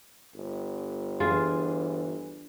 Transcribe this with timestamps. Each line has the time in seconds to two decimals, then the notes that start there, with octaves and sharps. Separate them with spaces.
0.35 G1
1.20 E3 D4 F4 G#4